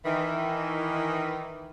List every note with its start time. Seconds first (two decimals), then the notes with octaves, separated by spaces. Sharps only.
0.05 D#3 E3